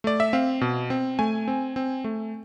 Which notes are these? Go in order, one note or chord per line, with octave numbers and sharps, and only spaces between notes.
A3 D5
E5
C4 F5
B2
C4
A3 G#5
C4
C4
A3